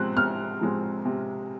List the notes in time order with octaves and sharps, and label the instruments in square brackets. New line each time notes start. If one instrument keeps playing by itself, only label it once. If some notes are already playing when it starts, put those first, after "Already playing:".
Already playing: [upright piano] C3 F3 G#3 C4 F#6
C3 F6
F3 G#3 C4
C3